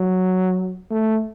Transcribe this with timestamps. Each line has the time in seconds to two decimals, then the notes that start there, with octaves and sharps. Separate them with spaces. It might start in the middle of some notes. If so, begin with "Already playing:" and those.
Already playing: F#3
0.91 A3